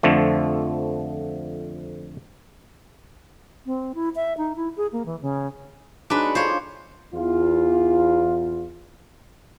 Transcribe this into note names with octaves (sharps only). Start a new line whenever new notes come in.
F2 D3 F3 A3
C4
E4
E5
D#4
E4
G#4
A#3
E3
C#3
F#3 G#3 D4 D#4 B4
C6 C#6
F4 A4 C5 C#5
E2 F4